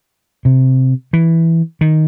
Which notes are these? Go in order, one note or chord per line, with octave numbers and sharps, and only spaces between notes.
C3
E3
D#3